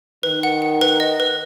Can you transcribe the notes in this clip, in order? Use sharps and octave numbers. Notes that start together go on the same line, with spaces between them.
D#3 B4
F#5
F#5
B4
D#5
B4